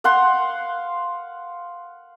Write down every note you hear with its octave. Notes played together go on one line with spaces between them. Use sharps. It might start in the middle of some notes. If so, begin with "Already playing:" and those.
F5 F#5 C6